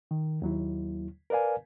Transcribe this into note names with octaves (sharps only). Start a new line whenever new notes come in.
D#3
D#2 F#3 E4
A#4 B4 D5 F5 G#5